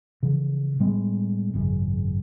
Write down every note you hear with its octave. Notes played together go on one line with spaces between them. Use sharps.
C#3 E3 F3
A2 G3 G#3 B3
G#1 F#2 C#3